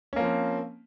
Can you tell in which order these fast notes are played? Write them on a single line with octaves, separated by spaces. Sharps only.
C#4 A#3 F3 C4